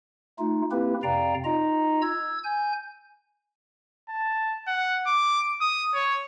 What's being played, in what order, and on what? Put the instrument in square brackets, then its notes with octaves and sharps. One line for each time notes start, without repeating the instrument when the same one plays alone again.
[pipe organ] A3 D#4 F4
A#3 C4 E4 G4 B4
F2 C3 D5 F5 G5 A#5
D#4 F4 D#5 A#5
E6 G#6
G#5 G6
[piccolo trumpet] A5
F#5
D6
D#6
C#5